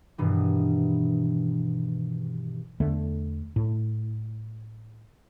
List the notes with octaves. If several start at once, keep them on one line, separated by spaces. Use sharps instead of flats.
G2 B2 D#3 E3
E2 D3 A3
A2